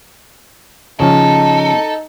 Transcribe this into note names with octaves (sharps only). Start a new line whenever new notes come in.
C#3 F3 C#4 D#4 A4